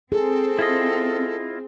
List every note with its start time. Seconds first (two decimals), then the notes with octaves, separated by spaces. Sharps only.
0.12 C4 G#4 A4
0.59 E4 F4 D#5